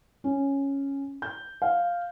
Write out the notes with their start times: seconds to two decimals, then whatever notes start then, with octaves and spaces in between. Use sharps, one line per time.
0.24 C#4
1.22 G6
1.62 F5